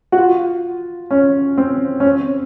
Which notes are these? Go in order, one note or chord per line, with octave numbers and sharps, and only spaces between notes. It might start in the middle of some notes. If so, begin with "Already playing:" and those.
F#4
F4
C#4
C4
C#4
C4